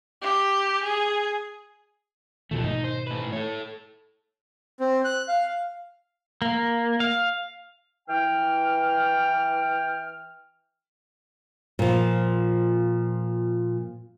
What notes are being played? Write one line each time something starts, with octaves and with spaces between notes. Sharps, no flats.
G4
G#4
D#2 B2 D#3 F3 A3
G#2 B2 D#3 D#4
C5
A2 B4
A4 C#5
C4
F#6
F5
A#3
F5
E3 G5 F6
A#2 F3